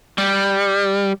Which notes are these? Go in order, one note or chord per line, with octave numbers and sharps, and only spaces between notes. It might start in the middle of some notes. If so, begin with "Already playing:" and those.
G3